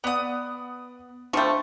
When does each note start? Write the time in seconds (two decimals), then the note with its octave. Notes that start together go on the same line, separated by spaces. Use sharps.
0.04 B3 D5 F#5 D#6
1.33 F3 G3 A3 D4 C5 G5 C#6